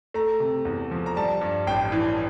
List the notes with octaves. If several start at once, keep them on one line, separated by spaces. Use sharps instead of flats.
A3 A#5
C3
E2
F3
A#5
G3 A5
G2
A1 G5
E3